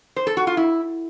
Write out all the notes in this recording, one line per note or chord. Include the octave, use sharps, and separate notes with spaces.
C5
A4
F#4
F4
E4